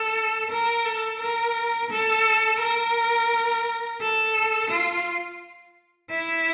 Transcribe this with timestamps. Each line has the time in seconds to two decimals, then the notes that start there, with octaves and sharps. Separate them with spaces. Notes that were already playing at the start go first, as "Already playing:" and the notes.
Already playing: A4
0.51 A#4
0.85 A4
1.20 A#4
1.91 A4
2.60 A#4
4.01 A4
4.71 F4
6.10 E4